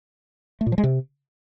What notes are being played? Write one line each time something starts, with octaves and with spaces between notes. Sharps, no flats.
A3
A#2
F3
G#3
C3